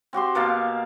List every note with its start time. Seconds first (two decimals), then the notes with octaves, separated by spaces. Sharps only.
0.13 C4 F#4 G4 C6
0.35 B2 A#3 F5 A5